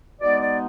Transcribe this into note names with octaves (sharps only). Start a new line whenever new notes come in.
B2 G#3 B3 D#4 D5
D5